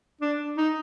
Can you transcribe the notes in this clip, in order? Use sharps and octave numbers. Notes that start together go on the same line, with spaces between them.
D4
D#4